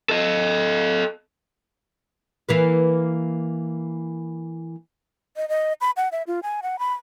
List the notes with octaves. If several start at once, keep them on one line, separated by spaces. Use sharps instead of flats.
A4 D#5
E3 A#3 B4
D#5
D#5
B5
F#5
E5
F4
G#5
F#5
B5